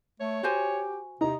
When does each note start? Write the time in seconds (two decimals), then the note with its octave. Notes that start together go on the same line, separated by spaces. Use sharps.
0.20 A3 C#5
0.43 F#4 G4 C5 G#5
1.21 C3 D#4 A#5